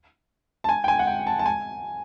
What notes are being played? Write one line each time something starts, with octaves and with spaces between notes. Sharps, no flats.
A5
G#5
G5
G#5
F#5
G5
A5
A5
G#5